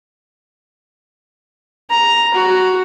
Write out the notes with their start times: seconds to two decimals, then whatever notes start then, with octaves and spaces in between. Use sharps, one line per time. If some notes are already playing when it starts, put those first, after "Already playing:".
1.90 A#5
2.34 F#4